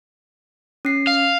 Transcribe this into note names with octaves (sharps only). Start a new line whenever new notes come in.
C#4 C7
F5